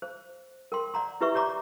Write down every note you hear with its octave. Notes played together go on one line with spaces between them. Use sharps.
C5
A#4 G5 C6
D5 F#5 A#5 C6
E4 G4 B4 D5 E5 C#6
G4 C#5 D5 A#5 D6